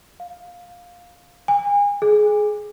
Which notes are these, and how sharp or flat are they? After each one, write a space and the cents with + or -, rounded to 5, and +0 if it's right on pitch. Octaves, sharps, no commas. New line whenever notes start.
F5 +15
G#5 -35
G#4 +20